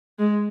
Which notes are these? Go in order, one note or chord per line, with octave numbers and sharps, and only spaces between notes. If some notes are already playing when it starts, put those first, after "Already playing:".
G#3